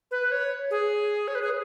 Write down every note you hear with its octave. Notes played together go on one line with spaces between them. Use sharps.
B4
C#5
G#4
C#5
B4
G#4